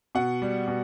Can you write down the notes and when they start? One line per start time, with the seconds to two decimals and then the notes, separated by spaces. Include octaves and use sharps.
0.15 B2 F#5
0.42 G3
0.68 B2